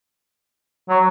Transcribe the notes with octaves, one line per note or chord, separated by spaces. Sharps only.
F#3